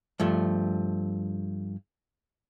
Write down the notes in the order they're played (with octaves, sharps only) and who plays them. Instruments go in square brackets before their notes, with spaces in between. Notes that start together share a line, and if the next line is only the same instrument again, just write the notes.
[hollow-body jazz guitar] G2 F3 A3